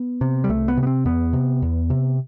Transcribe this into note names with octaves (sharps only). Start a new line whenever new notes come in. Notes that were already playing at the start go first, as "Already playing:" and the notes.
Already playing: B3
C3
G3
C2 A3
B3
C3
B3
C4
E2 B3
C3
E2
C3